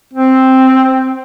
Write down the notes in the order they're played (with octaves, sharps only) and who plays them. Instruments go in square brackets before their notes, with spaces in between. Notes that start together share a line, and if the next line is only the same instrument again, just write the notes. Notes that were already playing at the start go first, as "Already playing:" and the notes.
[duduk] C4